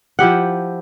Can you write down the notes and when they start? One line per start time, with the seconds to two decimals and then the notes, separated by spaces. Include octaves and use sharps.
0.19 F3 E4 G4 F#5